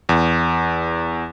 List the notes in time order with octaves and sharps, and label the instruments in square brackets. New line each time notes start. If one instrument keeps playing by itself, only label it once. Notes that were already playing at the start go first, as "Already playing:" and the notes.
[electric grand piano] E2